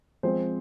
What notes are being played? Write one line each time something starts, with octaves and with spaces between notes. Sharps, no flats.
F3 G#3 C4 C5